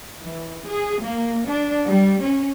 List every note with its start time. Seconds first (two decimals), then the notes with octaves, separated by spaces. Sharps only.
0.23 E3
0.67 G#4
1.02 A#3
1.48 D4
1.87 G3
2.22 C#4